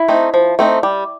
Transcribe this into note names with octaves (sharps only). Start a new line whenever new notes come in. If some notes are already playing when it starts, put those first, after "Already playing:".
Already playing: E4
A3 C4 D#4
F3
A3 C4 D#4
G3